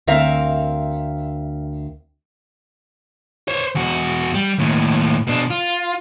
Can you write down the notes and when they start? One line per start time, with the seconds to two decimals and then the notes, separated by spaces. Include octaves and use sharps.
0.07 D2 C4 A#4 E5 F5
3.48 C5 C#5
3.75 E2 F#4
4.34 G3
4.58 D#2 A2
5.27 B2 D4
5.51 F4